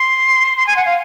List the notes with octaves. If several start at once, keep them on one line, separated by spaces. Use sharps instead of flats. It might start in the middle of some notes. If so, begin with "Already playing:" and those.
Already playing: C6
C6
G#5
F#5
F5